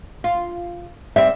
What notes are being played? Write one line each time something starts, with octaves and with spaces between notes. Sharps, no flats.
F4
G3 C4 E5